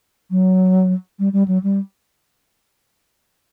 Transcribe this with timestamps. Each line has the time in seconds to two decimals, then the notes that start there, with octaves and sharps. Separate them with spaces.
0.31 F#3
1.19 G3
1.33 G3
1.48 F#3
1.63 G3